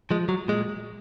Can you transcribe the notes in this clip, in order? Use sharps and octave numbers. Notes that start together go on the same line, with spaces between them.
F3 G#3
F#3
A#2 G#3